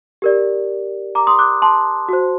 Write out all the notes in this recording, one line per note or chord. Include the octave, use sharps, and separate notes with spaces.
G4 A#4 D5
A#5 D6
C6 D#6
D6 F#6
A5 C6
F#4 C5